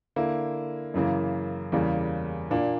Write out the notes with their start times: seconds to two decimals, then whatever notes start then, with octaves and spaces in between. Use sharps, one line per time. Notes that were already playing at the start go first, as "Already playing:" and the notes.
0.16 D3 A#3 E4
0.94 F#2 C#3 E3 A#3
1.72 E2 C#3 E3 G3 A#3
2.51 A#2 A#3 D4